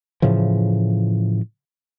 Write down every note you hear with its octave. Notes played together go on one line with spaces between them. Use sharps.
A2 C#3 E3 F3